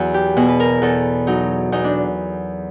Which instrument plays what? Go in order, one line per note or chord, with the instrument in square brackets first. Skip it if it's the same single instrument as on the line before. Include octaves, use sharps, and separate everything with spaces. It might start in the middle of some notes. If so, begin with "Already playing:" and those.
Already playing: [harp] E2 F#3
G4
B2 G#4
B4
A#4
E2 A4
F#3 D#4
E2 D#4
D4